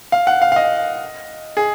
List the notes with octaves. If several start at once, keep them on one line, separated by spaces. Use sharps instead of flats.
F5
F#5
F5
F5
D#5
G#4